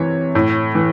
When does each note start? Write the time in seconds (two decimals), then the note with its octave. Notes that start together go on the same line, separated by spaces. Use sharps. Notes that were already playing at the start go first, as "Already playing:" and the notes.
Already playing: C3 E3 C#5
0.35 A2
0.75 E3